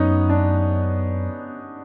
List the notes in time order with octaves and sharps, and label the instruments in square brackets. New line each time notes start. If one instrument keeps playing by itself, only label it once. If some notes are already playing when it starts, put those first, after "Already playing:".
Already playing: [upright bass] F#2 [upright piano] B3 C#4 D#4
[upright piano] D4